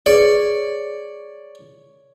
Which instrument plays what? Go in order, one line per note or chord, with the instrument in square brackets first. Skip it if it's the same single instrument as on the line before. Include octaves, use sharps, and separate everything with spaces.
[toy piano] G#4 B4 [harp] C#5 [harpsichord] D5